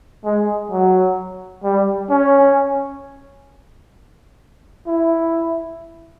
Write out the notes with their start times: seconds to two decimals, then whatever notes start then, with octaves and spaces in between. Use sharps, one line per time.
0.24 G#3
0.71 F#3
1.63 G3
2.10 C#4
4.87 E4